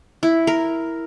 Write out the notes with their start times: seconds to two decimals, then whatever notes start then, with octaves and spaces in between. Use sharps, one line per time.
0.23 E4
0.47 A#4